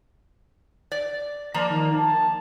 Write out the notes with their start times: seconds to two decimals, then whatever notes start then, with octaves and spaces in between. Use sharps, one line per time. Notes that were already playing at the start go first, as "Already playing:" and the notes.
0.92 D5
1.54 F3 A#3 D5 A#5
1.70 D#3
1.95 A5